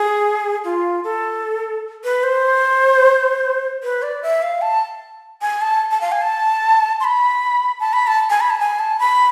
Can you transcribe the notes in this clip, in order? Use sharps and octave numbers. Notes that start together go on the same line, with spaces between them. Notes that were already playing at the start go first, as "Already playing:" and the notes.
Already playing: G#4
F4
A4
B4
C5
B4
D5
E5
F5
A5
G#5
A5
A5
F5
G#5
A5
C6
B5
A5
B5
A5
G#5
B5
A5
G#5
A5
B5